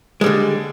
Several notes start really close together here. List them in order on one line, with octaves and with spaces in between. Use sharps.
G#3 G3 D3